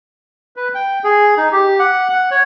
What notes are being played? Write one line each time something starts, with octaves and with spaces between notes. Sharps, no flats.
B4
G5
G#4
D#4
G4
F#5
F#5
C#5